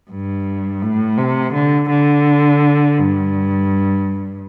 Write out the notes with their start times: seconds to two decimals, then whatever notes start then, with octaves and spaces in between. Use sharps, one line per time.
0.10 G2
0.82 A2
1.18 C3
1.54 D3
1.90 D3
2.98 G2